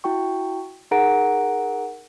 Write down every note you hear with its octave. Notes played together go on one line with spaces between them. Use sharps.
E4 F#4 G5 C#6
D#4 G#4 A#4 F#5 A#5 D7